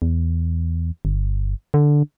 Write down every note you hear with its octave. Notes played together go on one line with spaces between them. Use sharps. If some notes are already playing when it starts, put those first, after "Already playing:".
E2
G1
D3